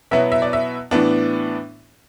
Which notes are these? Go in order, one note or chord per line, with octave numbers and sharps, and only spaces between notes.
B2 F#3 B3 E4 E5
E5
D5
E5
A2 E3 B3 D4